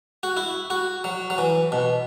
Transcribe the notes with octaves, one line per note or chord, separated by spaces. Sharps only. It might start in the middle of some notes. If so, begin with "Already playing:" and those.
F#4
E4
F#4
F#3
F#3
E3
B2